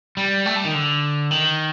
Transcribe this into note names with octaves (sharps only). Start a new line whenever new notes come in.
G3
A3
G3
D#3
D3
D#3